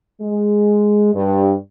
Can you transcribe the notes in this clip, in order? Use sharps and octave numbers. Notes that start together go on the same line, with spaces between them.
G#3
G2